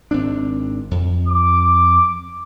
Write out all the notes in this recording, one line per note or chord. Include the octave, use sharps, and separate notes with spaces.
G#1 C4 D4
F2
D6